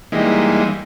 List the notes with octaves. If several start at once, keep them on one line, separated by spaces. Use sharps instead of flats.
E3 G3 G#3 A#3 D#4